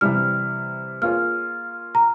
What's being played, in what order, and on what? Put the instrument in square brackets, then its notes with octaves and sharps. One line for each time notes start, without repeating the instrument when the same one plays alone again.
[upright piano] C3 E3 G3 [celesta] F6
[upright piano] A#3 F4 G#4 C#5 [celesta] F6
[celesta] A#5